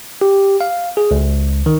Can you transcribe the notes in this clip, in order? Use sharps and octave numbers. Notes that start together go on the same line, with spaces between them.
G4
F5
G#4
C#2
D#3